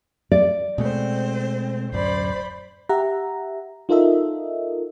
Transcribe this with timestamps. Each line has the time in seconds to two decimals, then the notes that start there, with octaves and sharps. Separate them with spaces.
0.31 D5
0.78 B2 G#3 A3 C4 C5
1.93 D1 F#2 C5 D5 B5
2.89 G4 E5 F#5 A#5
3.89 D#4 F4 A4 A#4 D#5 E5